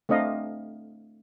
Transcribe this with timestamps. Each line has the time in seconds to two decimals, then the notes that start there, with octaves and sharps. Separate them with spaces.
0.09 A3 C4 D4 D#5 F5